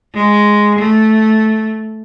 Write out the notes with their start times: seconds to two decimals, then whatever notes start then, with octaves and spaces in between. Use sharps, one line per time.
0.14 G#3
0.79 A3